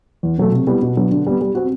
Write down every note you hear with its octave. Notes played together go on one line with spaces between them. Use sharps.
E2
B2 F#3 A3
C3
G3 B3 E4
B2
F#3 B3 D4
D3
G3 B3
G3
C4 F#4